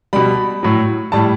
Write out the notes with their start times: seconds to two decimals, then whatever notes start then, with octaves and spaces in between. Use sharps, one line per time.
0.13 B2 G3 B5
0.63 A2 F#3
1.12 A2 G3 A5